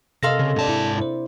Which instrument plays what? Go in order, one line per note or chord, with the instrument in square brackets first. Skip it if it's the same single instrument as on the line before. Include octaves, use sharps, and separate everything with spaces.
[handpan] C3 A#4 [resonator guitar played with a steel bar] C4 A4 F5 [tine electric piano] D#5 C6 A#6
[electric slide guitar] C#3
[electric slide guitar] G#2 A5 [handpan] D4 D5
[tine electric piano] E4
E4 C5